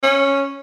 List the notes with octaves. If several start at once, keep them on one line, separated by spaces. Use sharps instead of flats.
C#4